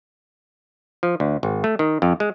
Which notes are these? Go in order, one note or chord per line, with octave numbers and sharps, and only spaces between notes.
F3
D2
G#1
A3
D#3
F2
G#3